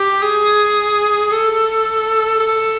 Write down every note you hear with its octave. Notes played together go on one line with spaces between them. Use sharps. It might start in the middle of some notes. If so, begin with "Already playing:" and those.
Already playing: G4
G#4
A4
A4